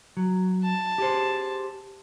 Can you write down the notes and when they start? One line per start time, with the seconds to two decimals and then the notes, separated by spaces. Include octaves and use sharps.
0.17 F#3
0.64 A5
0.98 G4 G#4 C5